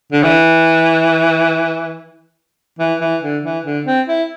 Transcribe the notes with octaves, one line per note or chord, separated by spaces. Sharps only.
D3
E3
E3
E3
D3
E3
D3
C4
E4